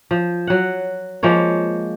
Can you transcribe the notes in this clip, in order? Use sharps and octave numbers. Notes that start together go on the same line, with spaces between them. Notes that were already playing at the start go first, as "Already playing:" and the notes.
F3
F#3 F#5
F3 G#3 A#3 C#5